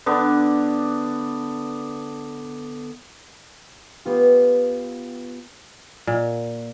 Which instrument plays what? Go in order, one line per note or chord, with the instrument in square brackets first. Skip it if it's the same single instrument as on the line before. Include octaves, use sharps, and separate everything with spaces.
[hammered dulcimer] D3 B3 D4
[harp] B3 F4 G4
[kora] A#2